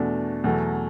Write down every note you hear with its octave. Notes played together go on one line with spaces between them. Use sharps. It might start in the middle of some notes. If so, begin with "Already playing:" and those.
Already playing: E2 B2 A3 D4
E2 B2 F#3 A3